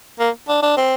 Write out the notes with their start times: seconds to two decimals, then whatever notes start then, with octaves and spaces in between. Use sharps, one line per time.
0.20 A#3
0.48 D4
0.63 D4
0.77 C4